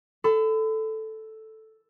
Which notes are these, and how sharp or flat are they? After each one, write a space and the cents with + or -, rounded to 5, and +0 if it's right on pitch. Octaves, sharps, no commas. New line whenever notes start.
A4 +0 B5 +40